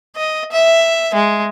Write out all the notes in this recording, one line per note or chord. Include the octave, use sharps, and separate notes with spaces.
D#5
E5
G#3